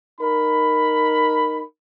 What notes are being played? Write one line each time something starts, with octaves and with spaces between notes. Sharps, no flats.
D#4 A#4 B5